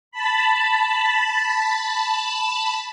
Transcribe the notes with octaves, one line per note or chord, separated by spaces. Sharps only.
A5 B5